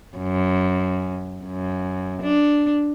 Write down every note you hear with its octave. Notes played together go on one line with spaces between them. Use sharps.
F#2
F#2
D4